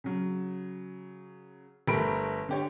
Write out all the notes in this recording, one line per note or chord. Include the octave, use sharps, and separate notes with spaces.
C#3 F#3
G1 A3 A#4 A#5 B5 D7
D3 G4 C#5